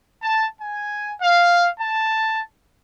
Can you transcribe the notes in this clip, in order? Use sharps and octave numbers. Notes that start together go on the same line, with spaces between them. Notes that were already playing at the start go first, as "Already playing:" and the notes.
A5
G#5
F5
A5